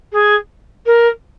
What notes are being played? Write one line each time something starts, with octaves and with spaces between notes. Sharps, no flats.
G#4
A#4